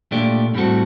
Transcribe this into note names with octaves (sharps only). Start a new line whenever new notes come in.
A#2 A3 D4 G4
A2 G3 C4 F#4 A4